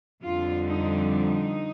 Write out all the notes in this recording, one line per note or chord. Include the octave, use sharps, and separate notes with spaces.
F2 D3 G3 F4
D#4
D#4